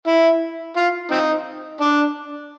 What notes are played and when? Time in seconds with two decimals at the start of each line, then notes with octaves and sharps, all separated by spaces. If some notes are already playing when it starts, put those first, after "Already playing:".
0.07 E4
0.77 F4
1.11 C4 D#4
1.81 D4